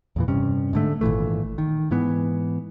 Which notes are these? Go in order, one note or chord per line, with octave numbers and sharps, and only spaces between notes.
E2 A#2 E3
G2 C3 C#4
G#2 D3 A3
G#1 A#2 E3 A3
D#3
G#2 E3 B3